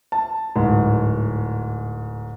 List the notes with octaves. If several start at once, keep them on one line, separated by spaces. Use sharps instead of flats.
A5
D1 G#2